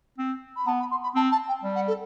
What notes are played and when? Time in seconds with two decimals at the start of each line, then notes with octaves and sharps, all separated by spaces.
0.18 C4
0.56 B5
0.66 B3 A5
0.79 B5
0.90 C6
1.03 B5
1.15 C4 A5
1.31 A5
1.48 G5
1.63 G3
1.75 F#5
1.87 A4